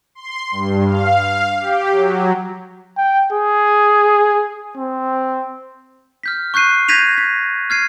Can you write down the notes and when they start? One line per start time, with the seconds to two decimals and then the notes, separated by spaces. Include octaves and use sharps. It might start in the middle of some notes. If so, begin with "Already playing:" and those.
0.15 C6
0.52 G2
0.85 F5
1.59 G4
1.90 F#3
2.97 G5
3.33 G#4
4.77 C4
6.23 F6 G6 B6
6.54 C#6 F#6 G6 C7 D#7
6.88 G6 G#6 A#6 B6 D#7 F7
7.18 B6
7.70 F6 G#6 C7 D#7